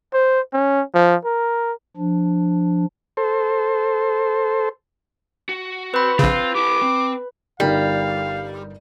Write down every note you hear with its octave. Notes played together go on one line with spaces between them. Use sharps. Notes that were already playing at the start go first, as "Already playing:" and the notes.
C5
C#4
F3
A#4
F3 D4
A4 C5
F#4
C4 B4 B5
A#1 C#3 C4 F4 F5
E4 G4 D6
C4
G1 G3 D#4 A#4 F5